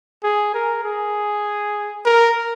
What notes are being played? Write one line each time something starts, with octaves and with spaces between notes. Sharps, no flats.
G#4
A#4
G#4
A#4